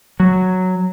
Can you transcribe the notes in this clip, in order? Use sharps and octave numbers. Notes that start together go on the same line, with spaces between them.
F#3